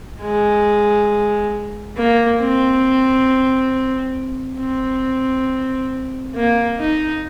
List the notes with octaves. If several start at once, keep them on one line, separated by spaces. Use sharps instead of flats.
G#3
A#3
C4
C4
A#3
D#4